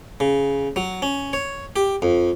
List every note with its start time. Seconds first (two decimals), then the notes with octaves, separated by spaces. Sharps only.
0.20 C#3
0.76 F#3
1.02 C#4
1.33 C#5
1.76 G4
2.02 F2